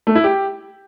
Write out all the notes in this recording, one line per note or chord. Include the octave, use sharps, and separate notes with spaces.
A3
E4
G4